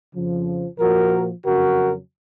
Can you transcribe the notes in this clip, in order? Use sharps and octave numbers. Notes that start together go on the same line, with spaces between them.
F2 C#3 F3
A#2 F3 F#4 A#4
F2 C#3 F#3 F#4 A#4